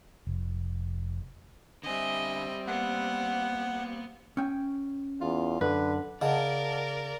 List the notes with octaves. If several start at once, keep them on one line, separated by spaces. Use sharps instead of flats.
F1
D3 G3 C4 D#5 E5 G#5
A#3 B3 F#5
C#4 G5
E2 F4
F#2 D3 B4
C#3 A#4 D5 D#5 F#5 A5